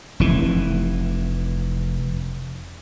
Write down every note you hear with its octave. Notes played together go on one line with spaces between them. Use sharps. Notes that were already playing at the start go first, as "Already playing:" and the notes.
F1 E3